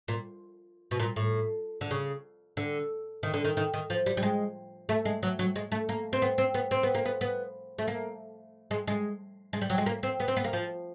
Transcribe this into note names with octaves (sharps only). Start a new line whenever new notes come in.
A#2
B2
A#2
A2
D3
C#3
D3
D#3
D3
D#3
D#3
D#3
F3
G3
G3
G#3
A3
G#3
F#3
F#3
G#3
A3
A#3
C4
B3
C4
B3
C4
B3
A#3
B3
B3
A3
A#3
G#3
G#3
G#3
G3
F#3
G#3
A#3
C4
B3
C4
B3
A#3
F3